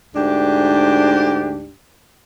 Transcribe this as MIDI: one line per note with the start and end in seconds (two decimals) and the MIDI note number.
0.15 1.71 38
0.15 1.71 44
0.15 1.71 62
0.15 1.71 67